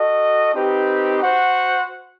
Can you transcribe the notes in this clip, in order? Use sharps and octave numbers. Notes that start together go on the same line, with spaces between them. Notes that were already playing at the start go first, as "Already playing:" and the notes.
Already playing: F#4 A4 D#5
C4 D#4 G4 B4
F#4 C5 F#5